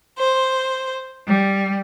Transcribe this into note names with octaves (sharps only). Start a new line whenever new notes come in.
C5
G3